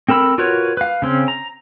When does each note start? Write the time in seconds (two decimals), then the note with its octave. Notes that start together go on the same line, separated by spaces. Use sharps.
0.08 C4 A4 A#4 B5 E6
0.38 F4 F#4 A#4 B4 C#5
0.77 B4 F5
1.02 C#3 C4 C#4
1.28 A#5